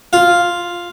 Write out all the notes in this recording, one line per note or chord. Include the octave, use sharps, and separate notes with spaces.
F4